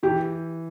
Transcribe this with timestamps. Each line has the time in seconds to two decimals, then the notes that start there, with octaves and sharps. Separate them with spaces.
0.03 E3 G4